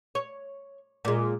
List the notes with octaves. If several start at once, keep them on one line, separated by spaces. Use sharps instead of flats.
C#5
A#2 G#3